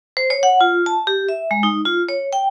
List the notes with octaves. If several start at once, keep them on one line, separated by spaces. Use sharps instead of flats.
C5
C#5
F#5
F4
A5
G4
E5
G#3
D#4
F4
C#5
G5